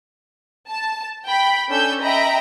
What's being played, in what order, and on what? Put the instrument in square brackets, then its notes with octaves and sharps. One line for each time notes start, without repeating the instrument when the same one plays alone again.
[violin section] A5
G5 B5
C#4 D4 A4 G#5 E6 G6
D#5 E5 G5 A#5 B5